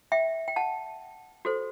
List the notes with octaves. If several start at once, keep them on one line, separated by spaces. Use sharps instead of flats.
E5 G5
G5
F#5 A5
F#4 A4 C5